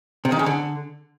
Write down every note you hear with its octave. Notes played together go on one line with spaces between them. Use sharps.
C3
D#3
C#3
D3